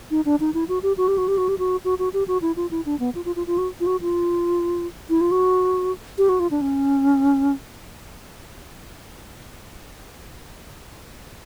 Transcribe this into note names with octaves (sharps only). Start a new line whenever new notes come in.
D#4
D4
D#4
E4
F#4
G4
F#4
G4
F#4
G4
F#4
G4
F#4
F#4
F#4
G4
F#4
E4
F4
E4
D4
B3
F4
F4
F4
F4
F#4
F4
F#4
F4
E4
F4
F#4
G4
F#4
F4
D4
C#4